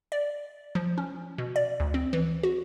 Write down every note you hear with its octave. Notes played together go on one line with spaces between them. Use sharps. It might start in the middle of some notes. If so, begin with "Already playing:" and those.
D5
F3
C#4
B2
D5
D2
C4
E3
F#4